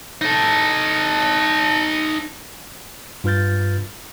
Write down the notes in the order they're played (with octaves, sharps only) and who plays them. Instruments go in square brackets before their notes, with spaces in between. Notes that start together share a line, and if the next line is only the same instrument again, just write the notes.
[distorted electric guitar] D#4 A4
[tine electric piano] G2 F4 B4 F6 G6 A6